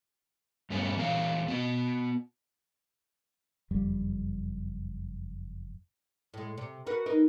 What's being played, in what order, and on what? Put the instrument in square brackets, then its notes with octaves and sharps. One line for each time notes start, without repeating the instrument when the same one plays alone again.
[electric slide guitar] G2 A3 B3 C#4 G#4 B4
E3 G#4 C#5 F5
B3 F#4
[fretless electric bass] F#1 F2 G3
[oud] A2 G#3
C3
F#4 A#4 B4
D#4 A#4 B4